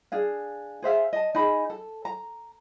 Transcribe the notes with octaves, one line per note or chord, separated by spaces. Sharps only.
D4 G#4 F5
G#4 C5 E5 F5
D#5 A5
D#4 G#4 B5
A4
A#5